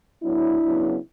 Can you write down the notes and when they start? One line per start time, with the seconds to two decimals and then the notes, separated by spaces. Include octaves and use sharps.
0.23 A2 F#3 B3 D4 E4
0.64 C#3 F#3 B3